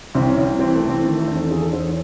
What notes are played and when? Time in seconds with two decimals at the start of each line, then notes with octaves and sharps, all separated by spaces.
0.15 C2 C4
0.29 C#4
0.37 C2
0.45 C4
0.59 E3 C4
0.75 A3
0.82 E3
0.90 C4
1.05 D#3 A3
1.20 A3
1.28 E2
1.35 C4
1.51 E2 G#4
1.61 A4
1.73 E2 C5
1.84 C#5